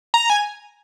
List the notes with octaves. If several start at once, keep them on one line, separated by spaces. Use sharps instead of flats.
A#5
G#5